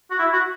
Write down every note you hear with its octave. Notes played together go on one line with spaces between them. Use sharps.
F#4
E4
F#4